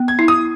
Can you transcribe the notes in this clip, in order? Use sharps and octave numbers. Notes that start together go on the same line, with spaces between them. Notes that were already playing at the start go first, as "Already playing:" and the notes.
Already playing: B3
G#6
E4
D#6